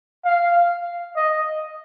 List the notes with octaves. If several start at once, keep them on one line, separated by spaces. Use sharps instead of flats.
F5
D#5